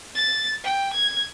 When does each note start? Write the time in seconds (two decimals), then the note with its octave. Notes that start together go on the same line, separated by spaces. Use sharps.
0.15 A6
0.64 G5
0.93 G#6